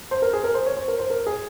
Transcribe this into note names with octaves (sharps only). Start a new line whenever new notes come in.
C5
A#4
G#4
A#4
C5
C#5
C5
A#4
C5
A#4
G#4